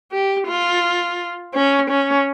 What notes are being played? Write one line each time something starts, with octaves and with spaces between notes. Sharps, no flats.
G4
F4
C#4
C#4